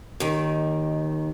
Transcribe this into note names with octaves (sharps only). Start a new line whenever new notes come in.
D#2 D#3